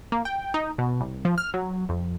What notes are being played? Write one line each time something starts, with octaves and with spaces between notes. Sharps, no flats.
A#3
G5
D#4
B2
C2
F3
F6
F#3
F2